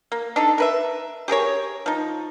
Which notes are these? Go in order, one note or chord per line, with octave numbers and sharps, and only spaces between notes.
A#3
D4 D#4 A4
A#4 B4 E5
G4 G#4 A#4 C#5
F3 D#4